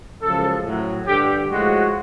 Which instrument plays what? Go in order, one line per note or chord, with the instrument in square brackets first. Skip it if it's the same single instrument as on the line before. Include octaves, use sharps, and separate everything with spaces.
[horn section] F#2 C#3 F3 G#3 A4
A2 F#3
G2 D3 G3 G4
A2 F3 G#3 F#4